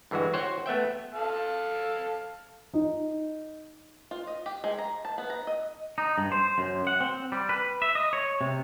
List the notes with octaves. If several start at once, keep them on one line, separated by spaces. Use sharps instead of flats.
G2 D3 E3 G#3 F#4
F#4 C5 C#5 F#5 G5
A3 B3 E5 G5
A4 F5 A5
D#4
F4
D#5
G4
G#3
A#5
A5
B3
A#5
D#5
D#4
G2
C5
F#2
F#5
C4
G3
B4
E5
D#5
C#5
C3